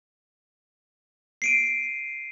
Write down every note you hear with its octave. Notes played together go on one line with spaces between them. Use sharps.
C7 D7 D#7